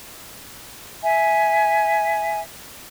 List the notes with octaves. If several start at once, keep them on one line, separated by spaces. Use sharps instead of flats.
E5 G#5